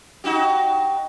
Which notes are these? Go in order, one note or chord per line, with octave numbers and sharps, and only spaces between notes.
D#4 F#4 G4